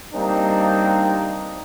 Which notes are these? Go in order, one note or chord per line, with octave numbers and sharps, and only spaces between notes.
G3 A#3 C4 D4 D#4